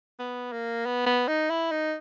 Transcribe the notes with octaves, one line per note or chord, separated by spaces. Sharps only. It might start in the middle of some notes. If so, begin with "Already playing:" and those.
B3
A#3
B3
B3
D#4
E4
D#4